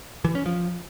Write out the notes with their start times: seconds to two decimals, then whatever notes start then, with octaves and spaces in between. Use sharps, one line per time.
0.25 E3
0.35 C#4
0.46 F3